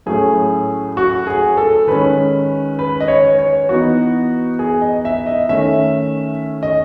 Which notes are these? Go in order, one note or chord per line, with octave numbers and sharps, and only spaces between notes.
A2 F#3 A3 C#4 G#4
F#4
G#4
A4
D#3 G#3 C#4 B4
B4
D#5
C#5
C#5
E3 B3 D#4 F#4
G#4
D#5
E5
D#5
D#3 A3 C#4 E5
D#5